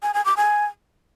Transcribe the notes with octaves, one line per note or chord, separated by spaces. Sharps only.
G#5
G#5
D6
G#5